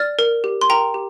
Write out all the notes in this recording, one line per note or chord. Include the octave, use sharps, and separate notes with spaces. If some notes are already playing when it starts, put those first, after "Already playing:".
Already playing: D5 F6 A6
A#4
G4
C6
A#4 G5 A#5
G4